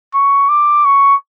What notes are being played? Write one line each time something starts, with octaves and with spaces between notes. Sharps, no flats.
C#6
D6
C#6